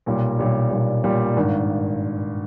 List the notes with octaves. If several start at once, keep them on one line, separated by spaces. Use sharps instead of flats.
B1 A#2 G3
B1 A#2 G3
B1 A#2 G3
B1 A#2 G3
G#1 G2 D#3